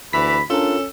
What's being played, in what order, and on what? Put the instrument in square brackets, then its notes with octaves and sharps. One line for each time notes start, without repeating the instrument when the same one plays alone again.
[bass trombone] D2 [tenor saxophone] E3 [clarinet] B5 [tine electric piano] B6
[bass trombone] C#4 [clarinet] D4 [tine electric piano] F4 A#4 [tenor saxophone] A4